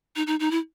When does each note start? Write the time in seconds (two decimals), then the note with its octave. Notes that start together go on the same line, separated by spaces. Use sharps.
0.16 D#4
0.27 D#4
0.40 D#4
0.51 E4